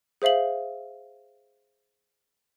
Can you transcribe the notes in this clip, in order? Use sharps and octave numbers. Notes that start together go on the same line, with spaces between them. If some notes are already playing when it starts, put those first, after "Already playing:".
G#4 C5 E5 F5 F#7